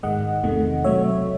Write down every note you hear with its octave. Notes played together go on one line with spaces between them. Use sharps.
G#2 D#3 G#3 D#5 F#5
E2 C3 D#3 A3
C3 F#3 A3 C#5 E5